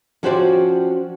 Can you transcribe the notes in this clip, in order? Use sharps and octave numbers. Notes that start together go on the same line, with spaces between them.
F3 C#4 F#4 G4 C5 D5